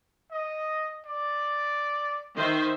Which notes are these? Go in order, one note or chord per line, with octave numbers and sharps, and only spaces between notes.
D#5
D5
D#3 C5 E5